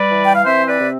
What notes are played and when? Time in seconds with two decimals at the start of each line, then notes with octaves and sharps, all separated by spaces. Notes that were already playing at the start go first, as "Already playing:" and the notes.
Already playing: G3 B4 D5
0.12 E3
0.25 G5
0.36 F5
0.45 C4 C5 E5
0.69 B4 D5
0.79 C3